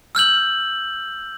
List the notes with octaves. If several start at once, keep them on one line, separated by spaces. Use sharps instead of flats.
E6 F6 G6 F#7